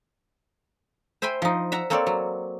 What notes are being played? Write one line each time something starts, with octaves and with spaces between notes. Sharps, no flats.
C5 E5 G5 G#5 B5 C6
F3 D#4
E5 F#5 A#5
A#3 C4 A4 C#5 D5
F#3